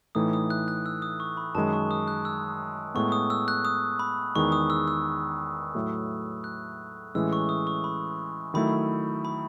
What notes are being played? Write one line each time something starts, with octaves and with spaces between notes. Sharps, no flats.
A2 E3 A3 D#4 D#6
D#6
F#6
F#6
E6
D#6
C#6
B5
F#2 D#3 G#3 A5
C#6
D#6
F#6
E6
A2 G#3 B3 C#6
D#6
E6
F#6
D#6
B5
E2 D#3 G#3 D#4 C#6
D#6
E6
E6
A2 F#3 A3
F#6
A2 E3 G#3 C#4 E6
C#6
D#6
C#6
B5
D#3 F#3 A3 E4 B5
B5